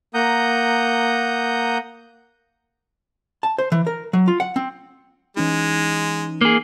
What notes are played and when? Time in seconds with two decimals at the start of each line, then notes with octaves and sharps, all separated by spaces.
0.14 A#3 F#5 A#5 D#6 G6
3.43 A5
3.58 C5
3.72 E3
3.87 A#4
4.13 F#3
4.28 F4
4.40 F#5
4.56 C4
5.37 E3 G#3 C#4 D#4
6.41 A#3 G#4